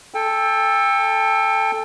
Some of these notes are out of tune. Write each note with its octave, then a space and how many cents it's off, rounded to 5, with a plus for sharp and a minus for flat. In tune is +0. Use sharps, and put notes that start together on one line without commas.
A4 +0 G5 +30